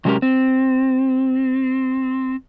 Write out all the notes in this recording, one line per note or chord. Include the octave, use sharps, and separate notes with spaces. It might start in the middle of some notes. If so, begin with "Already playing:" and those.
C3 F#3 G#3 C#4 G4 A#4
C4